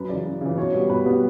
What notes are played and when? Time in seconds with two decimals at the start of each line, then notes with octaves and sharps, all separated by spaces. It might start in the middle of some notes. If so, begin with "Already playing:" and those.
Already playing: F#2 B4
0.09 C#3 E3 D5
0.25 F#2
0.41 C#3 E3
0.57 B2 C#5
0.73 G3 B3
0.90 B2 B4
1.06 G3 B3